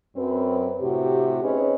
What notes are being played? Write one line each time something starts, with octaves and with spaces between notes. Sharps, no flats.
F#2 C4 B4
A2 C3 F#4 G4
C4 C#4 D#4 G#4 B4 C#5